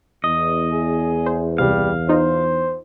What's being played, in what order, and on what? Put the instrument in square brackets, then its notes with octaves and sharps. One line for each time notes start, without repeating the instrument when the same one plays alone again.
[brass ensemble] E2 [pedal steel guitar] D#5
[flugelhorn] G#4
[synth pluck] C5
[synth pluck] C#2 C3 [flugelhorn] G3 [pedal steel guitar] F5
[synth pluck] D#4 F4 [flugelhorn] C5